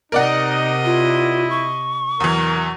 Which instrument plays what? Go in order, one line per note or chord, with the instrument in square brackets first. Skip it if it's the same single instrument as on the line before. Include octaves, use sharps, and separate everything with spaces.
[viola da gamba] C3 D#5 [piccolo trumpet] D#4 [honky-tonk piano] A#4 D5 F#5
[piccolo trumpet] E4 [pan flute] F4
[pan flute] C#6
[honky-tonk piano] E2 E3 [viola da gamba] F#3 [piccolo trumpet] A#4